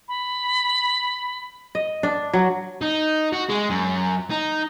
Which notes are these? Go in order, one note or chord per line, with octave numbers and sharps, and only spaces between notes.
B5
D#5
D4
F#3
D#4
F#4
G#3
F#2
D#4